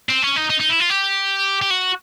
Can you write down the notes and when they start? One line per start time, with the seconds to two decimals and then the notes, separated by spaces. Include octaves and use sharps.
0.09 C4
0.23 C#4
0.36 D#4
0.50 D#4
0.60 D#4
0.69 E4
0.80 F4
0.90 G4
1.62 G4
1.70 F#4